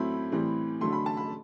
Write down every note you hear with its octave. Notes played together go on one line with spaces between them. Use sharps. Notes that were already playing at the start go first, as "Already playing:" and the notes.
Already playing: A2 F#3 A3 C4 E4 B5
A2 E3 G3 C4
D3 F#3 A3 C6
B5
A5
B5